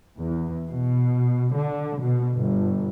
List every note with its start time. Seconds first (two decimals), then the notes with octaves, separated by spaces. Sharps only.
0.21 E2
0.70 B2
1.54 D3
2.02 B2
2.34 G1